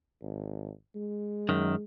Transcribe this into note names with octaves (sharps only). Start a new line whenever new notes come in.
G#1
G#3
F#2 D#3